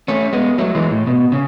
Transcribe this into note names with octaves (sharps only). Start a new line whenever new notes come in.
A3 C#4
G#3 B3
F#3 A3
E3 G#3
A2
B2
C#3